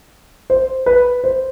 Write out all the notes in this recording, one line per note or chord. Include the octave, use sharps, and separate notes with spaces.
C5
B4
C5